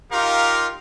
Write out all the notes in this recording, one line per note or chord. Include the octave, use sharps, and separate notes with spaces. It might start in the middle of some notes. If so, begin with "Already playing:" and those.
D#4 F4 G4 A#4 F5